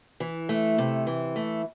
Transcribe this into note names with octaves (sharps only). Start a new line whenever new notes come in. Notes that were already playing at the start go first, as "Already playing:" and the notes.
E3
A3
C3
E3
A3